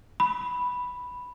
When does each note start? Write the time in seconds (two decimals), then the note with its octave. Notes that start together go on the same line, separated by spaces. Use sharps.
0.20 B5